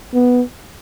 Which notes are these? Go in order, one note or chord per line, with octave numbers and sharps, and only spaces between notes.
B3